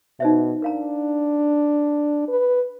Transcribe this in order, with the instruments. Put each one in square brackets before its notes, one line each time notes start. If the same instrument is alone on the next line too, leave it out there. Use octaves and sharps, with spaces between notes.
[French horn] B2 [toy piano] D#4 C5 E5
[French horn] D4 [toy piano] A#4 F5 A#5
[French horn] B4